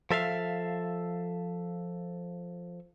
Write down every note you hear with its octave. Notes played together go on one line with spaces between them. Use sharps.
F3 A4 E5 F5